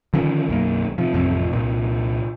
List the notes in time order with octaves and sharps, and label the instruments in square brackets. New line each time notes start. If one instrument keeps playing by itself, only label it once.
[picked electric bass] D3 D#3 F3 C#4
B1 F#2 A#3
C3 F3
A1 F2 C3 F3
C2 A#2